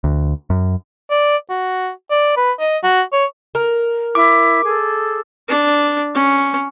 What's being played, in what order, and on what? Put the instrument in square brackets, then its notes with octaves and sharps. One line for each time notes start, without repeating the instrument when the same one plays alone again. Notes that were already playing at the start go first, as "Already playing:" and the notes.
[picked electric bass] D2
F#2
[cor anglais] D5
F#4
D5
B4
D#5
F#4
C#5
[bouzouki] A#4
[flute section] E4 [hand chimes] D6
[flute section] G#4 A4
[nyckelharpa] D4
C#4